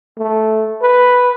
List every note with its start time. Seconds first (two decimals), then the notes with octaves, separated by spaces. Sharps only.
0.18 A3
0.82 B4